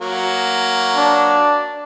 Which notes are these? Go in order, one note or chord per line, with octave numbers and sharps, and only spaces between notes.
F#3 A#3 F#4
D4